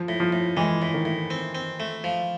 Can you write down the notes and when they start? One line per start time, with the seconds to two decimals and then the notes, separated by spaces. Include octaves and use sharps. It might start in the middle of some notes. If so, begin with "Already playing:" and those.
Already playing: F3
0.08 A2
0.20 F3
0.32 A2
0.57 E3 G#3
0.82 A2
0.94 D#3
1.05 A2
1.30 C4
1.55 C4
1.80 A3
2.04 F3